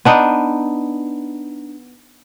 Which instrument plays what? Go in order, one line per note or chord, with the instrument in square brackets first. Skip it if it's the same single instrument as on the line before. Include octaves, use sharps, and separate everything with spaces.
[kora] B3 D4 D#4